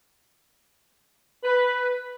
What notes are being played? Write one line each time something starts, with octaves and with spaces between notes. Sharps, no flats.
B4